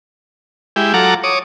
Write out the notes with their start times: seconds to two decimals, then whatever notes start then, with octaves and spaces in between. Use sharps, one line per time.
0.76 G#3 E4 G4
0.94 F#3 F4 A4 F#5 A#5 D6
1.24 C#5 D6 D#6